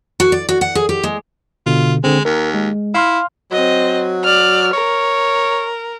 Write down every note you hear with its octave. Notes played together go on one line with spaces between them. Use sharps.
F#4
D5
F#4
F#5
G#4
G4
G#3
B2 D3 F4
D3 G#3 C4
D#2 A#4
G#3
E4 F5 C6 F6
F#3 C4 D#5
D5 F6
A#4 C#5